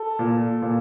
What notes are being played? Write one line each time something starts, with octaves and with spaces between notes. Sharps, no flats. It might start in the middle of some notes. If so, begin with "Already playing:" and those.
Already playing: A4
A#2
A#2